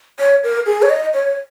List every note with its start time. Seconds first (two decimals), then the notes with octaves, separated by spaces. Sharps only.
0.19 C#5
0.44 A#4
0.66 G#4
0.82 C#5
0.90 D#5
1.14 C#5